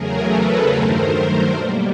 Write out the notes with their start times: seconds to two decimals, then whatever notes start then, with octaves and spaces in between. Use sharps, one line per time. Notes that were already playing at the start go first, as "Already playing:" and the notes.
Already playing: E2 C#3 F#3 A3 G#4 A#4
0.30 A4 B4
0.71 G2 D#3 F#3 A3 A#4 C5
1.51 B2 G3 A#3